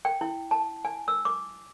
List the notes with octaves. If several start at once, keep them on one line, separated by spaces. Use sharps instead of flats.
G5
E4
A5
G#5
E6
D6